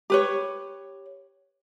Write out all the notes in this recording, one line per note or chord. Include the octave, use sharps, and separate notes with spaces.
G4 B4 C#5